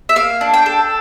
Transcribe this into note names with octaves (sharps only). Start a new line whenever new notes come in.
E5
A#3 F5
D4
G5
A4